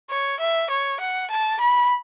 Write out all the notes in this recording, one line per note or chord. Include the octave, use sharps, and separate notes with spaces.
C#5
E5
C#5
F#5
A5
B5